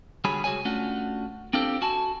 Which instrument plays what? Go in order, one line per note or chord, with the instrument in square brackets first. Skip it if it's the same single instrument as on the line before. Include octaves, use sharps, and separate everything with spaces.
[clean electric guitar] D3 G3 F#4 G#4 C#5 B5
C#2 F#4 G#4 C#5 G#5
A3 C#4 D4 F4 F#4
C4 D4 F4 G4 A4 C5
F#4 G#5 A5